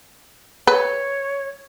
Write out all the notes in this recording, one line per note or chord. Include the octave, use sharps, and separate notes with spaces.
B4 C#5